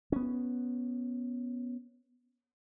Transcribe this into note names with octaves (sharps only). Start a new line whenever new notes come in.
B3 C#4